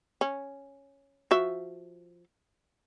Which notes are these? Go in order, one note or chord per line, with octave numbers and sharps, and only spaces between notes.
C#4
F3 F#4 E5